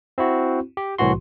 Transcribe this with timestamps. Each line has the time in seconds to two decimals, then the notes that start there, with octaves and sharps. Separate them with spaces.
0.18 C4 E4 F#4
0.77 G4
0.98 C2 A2 E3 F#4 C6